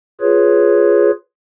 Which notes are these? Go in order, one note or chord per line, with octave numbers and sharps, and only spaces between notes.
F4 G#4 B4 C#5